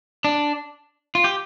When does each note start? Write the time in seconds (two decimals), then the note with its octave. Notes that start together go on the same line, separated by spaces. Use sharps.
0.24 D4
1.15 F4
1.24 G4